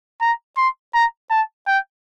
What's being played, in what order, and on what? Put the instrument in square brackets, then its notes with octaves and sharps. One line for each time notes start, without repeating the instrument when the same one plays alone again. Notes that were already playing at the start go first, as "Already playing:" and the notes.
[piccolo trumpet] A#5
C6
A#5
A5
G5